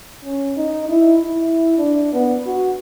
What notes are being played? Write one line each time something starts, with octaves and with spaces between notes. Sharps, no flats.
C#4
D#4
E4
E4
D4
B3
F#4